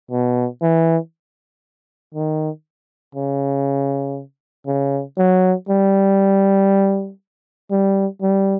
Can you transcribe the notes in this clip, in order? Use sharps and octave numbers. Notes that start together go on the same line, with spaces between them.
B2
E3
D#3
C#3
C#3
F#3
G3
G3
G3